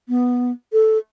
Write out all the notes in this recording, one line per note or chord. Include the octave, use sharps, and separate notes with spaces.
B3
A4